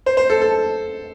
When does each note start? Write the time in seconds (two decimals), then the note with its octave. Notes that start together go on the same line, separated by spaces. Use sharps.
0.06 C5
0.17 C5
0.30 A4
0.42 A4